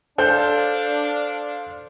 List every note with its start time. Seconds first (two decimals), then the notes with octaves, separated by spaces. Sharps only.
0.18 D4 A4 C5 F5 G6